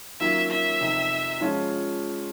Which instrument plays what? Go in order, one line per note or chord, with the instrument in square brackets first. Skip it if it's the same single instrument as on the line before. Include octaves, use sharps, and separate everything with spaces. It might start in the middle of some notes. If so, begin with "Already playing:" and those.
[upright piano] D#3 F#3 A#3 C#4 F4 [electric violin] E5
[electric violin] E5
[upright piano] F2 C3 D#3
F3 G#3 C#4 F4